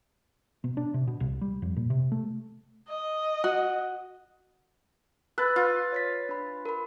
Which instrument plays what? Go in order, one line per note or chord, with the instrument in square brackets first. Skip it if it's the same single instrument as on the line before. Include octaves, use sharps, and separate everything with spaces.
[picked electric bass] B2
D4
C3
B2
C2
G3
F2
A#2
C3
A3
[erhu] D#5
[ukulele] F#4
[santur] B4 [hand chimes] E6 F#6 A6
[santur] F4
[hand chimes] C#5 A6 B6
D4 B5
A#4 B5